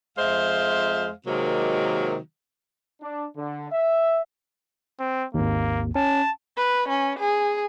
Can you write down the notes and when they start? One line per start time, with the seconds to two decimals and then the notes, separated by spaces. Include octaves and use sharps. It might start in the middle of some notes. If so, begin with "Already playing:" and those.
0.18 F2 G#3 C5 E5 F5
1.27 C3 D#3 F#3 G#3 A#3
3.01 D4
3.36 D3
3.71 E5
5.00 C4
5.34 G#1 D#2 A#3
5.95 C#4 A5
6.57 B4
6.89 C#4
7.20 G#4